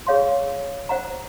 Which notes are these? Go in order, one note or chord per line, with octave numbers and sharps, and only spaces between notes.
G#4 C#5 F5 C6
C5 F#5 A#5